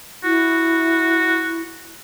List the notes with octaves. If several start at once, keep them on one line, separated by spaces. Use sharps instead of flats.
E4 F#4